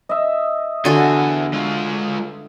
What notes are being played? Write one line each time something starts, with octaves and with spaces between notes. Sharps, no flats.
D#5 E5
E2 D3 F#4 G#5
G#3 F4